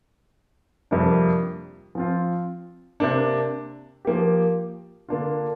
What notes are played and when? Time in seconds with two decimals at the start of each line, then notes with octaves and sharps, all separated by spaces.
0.91 F2 C3 G3 A#3 D4
1.95 F3 C4 F4
3.00 C3 A#3 D4
4.05 F3 A#3 G4
5.08 D3 A#3 D4 F4